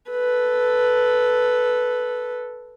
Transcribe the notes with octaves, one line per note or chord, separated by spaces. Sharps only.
A4 B4